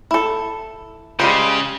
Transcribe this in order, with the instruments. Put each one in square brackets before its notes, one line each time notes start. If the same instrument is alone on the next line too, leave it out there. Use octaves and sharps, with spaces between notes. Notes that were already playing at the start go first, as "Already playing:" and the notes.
[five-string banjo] E4 A4
[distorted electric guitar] C#3 [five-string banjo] G3 G#3 C5